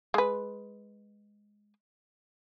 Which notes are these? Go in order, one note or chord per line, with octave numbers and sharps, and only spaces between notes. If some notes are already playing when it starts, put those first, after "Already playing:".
G#3 B4